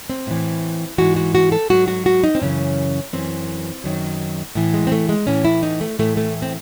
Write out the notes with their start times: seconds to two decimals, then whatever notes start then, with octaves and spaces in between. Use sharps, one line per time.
0.10 C4
0.27 A2 E3
0.98 G#2 E3 F#4
1.16 F#4
1.35 F#4
1.52 A4
1.69 G#2 F#3 F#4
1.88 F#4
2.06 F#4
2.24 D#4
2.35 C4
2.42 F#2 C#3 E3 C#4
3.13 F#2 E3 C4
3.84 F#2 D#3 F#3
4.55 A2 E3
4.74 G#3
4.87 C4
4.92 A3
5.09 G#3
5.27 A2 E3 C#4
5.45 E4
5.63 D#4
5.81 A3
5.99 A2 E3 A3
6.17 A3
6.42 C4